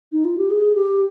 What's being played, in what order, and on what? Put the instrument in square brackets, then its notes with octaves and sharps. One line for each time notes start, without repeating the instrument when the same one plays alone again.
[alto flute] D#4
F4
G4
G#4
G4